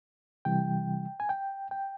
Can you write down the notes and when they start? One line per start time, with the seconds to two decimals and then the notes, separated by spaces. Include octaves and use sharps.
0.45 C3 E3 G3 G5
1.20 G#5
1.29 G5
1.71 G5